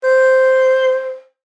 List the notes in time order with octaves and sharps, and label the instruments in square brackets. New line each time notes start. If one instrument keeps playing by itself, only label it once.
[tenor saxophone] C5